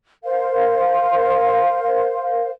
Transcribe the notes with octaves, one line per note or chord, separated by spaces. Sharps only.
A#4 C5 F5